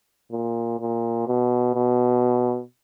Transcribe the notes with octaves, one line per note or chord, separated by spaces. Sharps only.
A#2
A#2
B2
B2